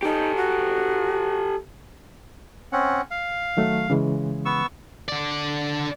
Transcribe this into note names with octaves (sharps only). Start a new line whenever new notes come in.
D#4 G4 A4
F#4
C4 C#4 F#5
F5
D#3 F#3 A3
C#3 E3 G#3
B3 C#6 E6
D3 D5